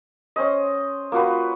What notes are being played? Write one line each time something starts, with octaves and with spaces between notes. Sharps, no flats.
C#4 C5 D#5
A#3 F4 F#4 B4